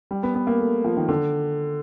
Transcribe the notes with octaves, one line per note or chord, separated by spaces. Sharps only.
G3
B3
B3
A#3
A3
F3
D#3
D3